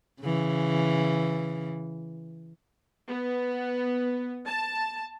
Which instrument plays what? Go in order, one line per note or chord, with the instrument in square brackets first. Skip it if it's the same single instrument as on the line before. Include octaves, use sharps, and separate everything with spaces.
[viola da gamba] C#3 E3
[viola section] B3
A5